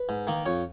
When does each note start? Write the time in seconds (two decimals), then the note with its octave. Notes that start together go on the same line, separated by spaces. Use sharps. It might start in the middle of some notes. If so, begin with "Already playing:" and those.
Already playing: B4
0.09 G#2
0.27 D#3 A#3
0.46 F2 C#5